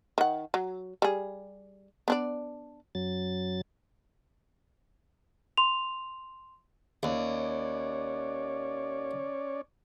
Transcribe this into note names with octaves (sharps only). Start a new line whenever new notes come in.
D#3 F#5
F#3
G3 G#4
B3 D4 D5
F#2 F#3 A6
C6 F7
D#2 C#4 C#5 D5